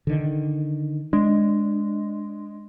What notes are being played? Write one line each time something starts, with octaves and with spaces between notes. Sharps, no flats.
D3 D#3
G#3 D4